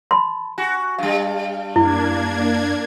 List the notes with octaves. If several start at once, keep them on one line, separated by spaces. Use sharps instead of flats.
A5 B5 C6
F#4 G#5
G2 G3 F5
F#2 A#3 D4 E4 G#6